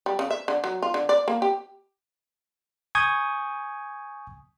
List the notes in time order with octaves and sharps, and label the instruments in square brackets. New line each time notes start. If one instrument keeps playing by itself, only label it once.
[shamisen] G3
C#3
E5
D3
F#3
F4
D3
D5
A#3
G4
[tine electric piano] G#5 C#6 D#6 G6 G#6